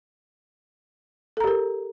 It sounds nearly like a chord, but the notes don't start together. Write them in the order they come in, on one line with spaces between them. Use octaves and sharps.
A4 A#5 G4 A#4